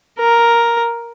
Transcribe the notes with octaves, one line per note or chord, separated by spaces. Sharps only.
A#4